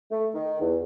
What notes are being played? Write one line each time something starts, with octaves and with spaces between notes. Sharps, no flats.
A3
D#3
E2